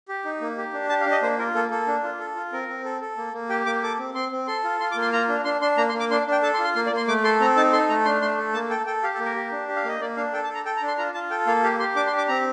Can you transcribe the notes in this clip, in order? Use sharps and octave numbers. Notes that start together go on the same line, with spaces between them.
G4
D#4
A#3
G4
D4
G4 A5
F5
D4
D#5
A#3 C5
F4 A#4
A#3 A4
A#3 A4
D4
F4
A4
F4
C4 A#4
C4
A4
A4
A#3
A#3
G4 G5
A#3 D6
A4 D6
C4
C4 C6
C4
A4 C6
F4
F4 C6
D6
A#3
C6
F4 A#5
D4
D4 C6
D4 C6
A#3 A#5
C6
A#3
D6
D4 C6
D4
G5
A4 A5
C6
F4
C6
A#3 C6
D5
A#3 C6
A3 D6
A4 C6
C4 A#5
D#4 A5
A4 C6
A3 A#5
D4 C6
A3 C6
A4
A#3 A5
A4 G5
A4 G5
G4 F5
A4
A#3
A#4
G4
D4
G4
F5
A#3 D#5
A#3 D5
D4 F5
A4 G5
A5
A4
A#5
A4 G5
A#5
D4
C6
F4 A#5
F4 A5
A4 G5
A#3 F5
G4 F5
G4 C6
D4 D6
C6
G4
D6
C4 A#5